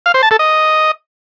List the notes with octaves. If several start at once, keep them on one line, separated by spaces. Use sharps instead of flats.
F5
C5
A5
A4
D#5